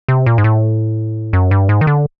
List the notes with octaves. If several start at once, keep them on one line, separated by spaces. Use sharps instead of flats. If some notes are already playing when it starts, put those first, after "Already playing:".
C3
A#2
G#2
A2
F#2
G2
G#2
D#3
D3